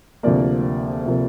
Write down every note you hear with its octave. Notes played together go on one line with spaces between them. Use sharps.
D2 C3 F3 A#3 D5
C3 F3 A#3